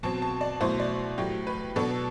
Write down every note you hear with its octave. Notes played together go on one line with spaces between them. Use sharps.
B2 F#3 C4 A5
A5
D5
B2 F#3 A3 E4 C5
D5
A2 F#3 A3 G4
B4
B2 F#3 B3 D4 A4